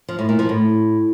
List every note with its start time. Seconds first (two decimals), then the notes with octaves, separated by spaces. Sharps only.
0.08 F3
0.19 A2
0.29 A#2
0.39 F3
0.49 A2